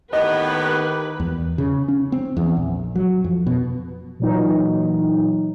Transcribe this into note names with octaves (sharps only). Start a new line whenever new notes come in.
D#2 A2 D#3 B3 G4 B4 D#5
E2
C#3
C#4
C4
E2
A#1
F#3
F2
B2
A#2 E3 F#3 D#4